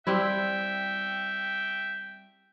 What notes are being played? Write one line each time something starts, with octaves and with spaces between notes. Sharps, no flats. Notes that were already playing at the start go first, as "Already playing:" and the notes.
G3 C4 E4 E5 G5